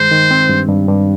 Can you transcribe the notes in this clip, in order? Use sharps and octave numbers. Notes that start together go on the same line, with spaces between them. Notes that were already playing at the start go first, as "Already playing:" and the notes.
Already playing: G2 D#3 G#3 C5
D#3
C4
G2
G2
G2